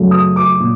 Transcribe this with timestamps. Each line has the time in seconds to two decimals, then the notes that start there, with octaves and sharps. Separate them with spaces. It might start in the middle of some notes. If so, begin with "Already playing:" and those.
Already playing: F#2 C#3 F#3 A3
0.11 D#6
0.36 D6
0.60 A#2